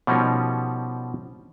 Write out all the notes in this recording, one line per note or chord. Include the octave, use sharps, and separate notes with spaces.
B2 F3 G3 C#4 D#4 A#4